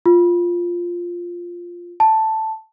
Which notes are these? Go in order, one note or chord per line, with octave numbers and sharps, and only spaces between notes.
F4
A5